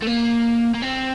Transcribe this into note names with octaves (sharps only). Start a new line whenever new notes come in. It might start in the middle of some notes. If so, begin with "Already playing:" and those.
A3
A#3
A#3
C4